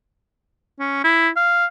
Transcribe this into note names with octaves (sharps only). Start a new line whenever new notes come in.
C#4
E4
F5